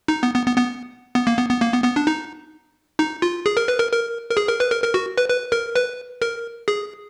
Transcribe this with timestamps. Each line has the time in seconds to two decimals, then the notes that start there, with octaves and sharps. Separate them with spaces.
0.08 D#4
0.23 B3
0.35 B3
0.47 B3
0.57 B3
1.15 B3
1.27 A#3
1.38 B3
1.49 B3
1.61 A#3
1.73 B3
1.84 B3
1.96 D4
2.07 D#4
2.99 D#4
3.22 F4
3.46 G#4
3.57 A#4
3.68 B4
3.79 A#4
3.92 A#4
4.30 A#4
4.37 G#4
4.48 A#4
4.60 B4
4.71 A#4
4.84 A#4
4.94 F#4
5.18 B4
5.29 B4
5.52 A#4
5.76 B4
6.22 A#4
6.68 G#4